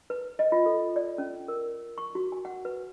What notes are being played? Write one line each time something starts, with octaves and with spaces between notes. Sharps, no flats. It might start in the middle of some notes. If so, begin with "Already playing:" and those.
B4
D#5
F4
A4
D5
C#4
A#4
C#6
F#4
G#5
F#5
B4